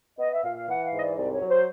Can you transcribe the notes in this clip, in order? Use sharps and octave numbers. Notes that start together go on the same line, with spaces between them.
B3 D#5
E5
A#2 F5
F5
E3 F#5
F5
G#2 D#5
D5
C2 D5
C#5
F#3
C5